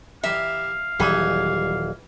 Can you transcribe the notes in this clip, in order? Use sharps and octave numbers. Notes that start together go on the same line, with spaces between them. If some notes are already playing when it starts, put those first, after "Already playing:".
E3 G4 E5 F5 A#5
D#1 G2 E3 F#3 G#4